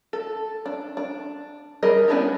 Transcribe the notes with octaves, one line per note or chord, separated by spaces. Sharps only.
A4
D4
D4
G3 G#4 A#4 D#5
B3 C#4 D4 E4 G4